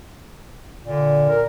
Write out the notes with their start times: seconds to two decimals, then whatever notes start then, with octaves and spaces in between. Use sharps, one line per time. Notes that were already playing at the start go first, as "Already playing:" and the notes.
0.84 A#2 D3
1.30 A#4